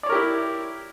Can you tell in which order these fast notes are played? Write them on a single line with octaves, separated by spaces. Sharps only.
D5 C#5 A#4 G4 E4